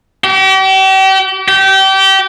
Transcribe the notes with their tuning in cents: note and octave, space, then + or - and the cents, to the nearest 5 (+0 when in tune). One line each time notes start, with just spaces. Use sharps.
G4 -40
G4 -25